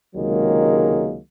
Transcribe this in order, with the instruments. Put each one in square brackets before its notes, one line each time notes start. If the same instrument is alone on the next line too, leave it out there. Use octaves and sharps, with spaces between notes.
[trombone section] C#2 C3 D#3 F#3 G#3 A#3